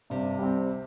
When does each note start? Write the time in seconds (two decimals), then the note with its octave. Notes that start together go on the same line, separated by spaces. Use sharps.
0.10 G2 C3
0.39 G3 C4